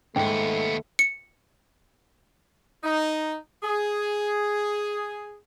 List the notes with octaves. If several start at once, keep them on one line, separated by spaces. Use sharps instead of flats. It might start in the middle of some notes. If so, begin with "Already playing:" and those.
D#2 G#2 A3 B3 G5
C#7
D#4
G#4